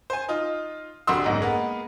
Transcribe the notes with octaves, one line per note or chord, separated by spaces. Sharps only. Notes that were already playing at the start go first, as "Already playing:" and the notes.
C5 G#5
D#4 F4
C2 D3 G3 F#4 C6 E6
F#1 B1 G#2
G#3 A#3 B3